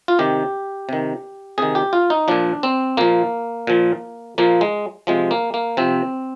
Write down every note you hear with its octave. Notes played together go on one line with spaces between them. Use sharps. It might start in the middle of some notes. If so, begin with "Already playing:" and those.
F4
C3 D#3 G4
C3 D#3
C3 D#3 G#4
G4
F4
D#4
A#2 F3 D4
C4
A#2 F3 A#3
A#2 F3
A#2 F3 A#3
G#3
C3 F3 G#3
A#3
A#3
C3 F3 C4